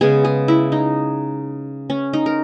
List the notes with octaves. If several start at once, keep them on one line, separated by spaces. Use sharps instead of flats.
C#3 G#3 B3 G#4
G#4
E4
D#4
C#4
D#4
A#4